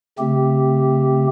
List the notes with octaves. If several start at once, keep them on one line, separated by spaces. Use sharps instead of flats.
C#3 A3 C4 G4